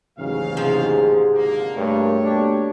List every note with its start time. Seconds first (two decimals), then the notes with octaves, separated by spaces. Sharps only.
0.19 A1 D#2 G#2 C#3 E3 F#3 F5
0.57 C3 F3 G#3
1.35 G#1 D3 A#3
1.76 G2 A3 A#3 A#4 C#5
2.24 B2 A#3 D4 G4